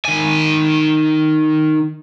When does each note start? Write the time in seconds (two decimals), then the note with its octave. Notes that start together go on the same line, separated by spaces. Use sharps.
0.05 D#3 G#5